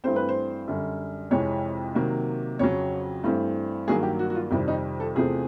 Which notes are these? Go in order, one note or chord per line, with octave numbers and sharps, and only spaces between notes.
G2 E3 A3 C4 C5
B4
C5
F#2 D3 G3
F2 C3 E3 G#3 C#5
C3 D#3 F#3 A#3
F2 C#3 F#3 C#5
G2 E3 A3 C4
G2 D#3 F#3 A#3 G#4
G4
F#4
F#4
F4
F2 C3 D#3 G3 C4 E4
D#4
A4
E2 C3 F3 A3 C4 G#4